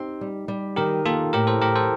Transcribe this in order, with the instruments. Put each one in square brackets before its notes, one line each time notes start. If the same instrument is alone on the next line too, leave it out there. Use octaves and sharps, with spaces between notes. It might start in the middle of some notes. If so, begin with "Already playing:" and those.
Already playing: [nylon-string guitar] C4 [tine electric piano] D#4 G4
[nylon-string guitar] G3
G3
[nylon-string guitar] D#3 [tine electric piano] G4 A#4
[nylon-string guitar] A#3 [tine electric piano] F4 A4
[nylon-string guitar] A2 [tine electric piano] G4 A#4
[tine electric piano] A4 C5
[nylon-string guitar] A2 [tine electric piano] G4 A#4
[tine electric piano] A4 C5